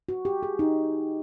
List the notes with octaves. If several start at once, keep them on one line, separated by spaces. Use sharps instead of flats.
F#4
G4
G#4
D#4